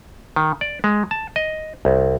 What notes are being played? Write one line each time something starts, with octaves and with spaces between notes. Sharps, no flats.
D#3
D5
G#3
A5
D#5
C2